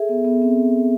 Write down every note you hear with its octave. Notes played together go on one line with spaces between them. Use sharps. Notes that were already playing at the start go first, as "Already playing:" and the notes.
Already playing: G#4 A4 E5
B3
B3
C4